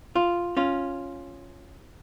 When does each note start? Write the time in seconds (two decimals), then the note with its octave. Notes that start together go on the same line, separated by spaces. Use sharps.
0.15 F4
0.57 C#4 F4